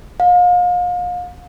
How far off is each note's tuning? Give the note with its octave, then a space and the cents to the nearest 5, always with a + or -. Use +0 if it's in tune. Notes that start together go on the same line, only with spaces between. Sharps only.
F5 +35